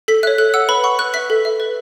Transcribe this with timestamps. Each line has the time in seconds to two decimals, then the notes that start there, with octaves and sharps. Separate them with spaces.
0.08 A4 B6
0.23 C#5 E5 F#6
0.38 A4 F#6
0.54 F#5 E6
0.69 B4 B5
0.84 F#5 C#6
0.99 B4 F#6
1.14 E5 B6
1.30 A4
1.45 E5
1.60 B4